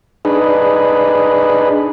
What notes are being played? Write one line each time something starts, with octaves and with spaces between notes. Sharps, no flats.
D4 D#4 G#4 B4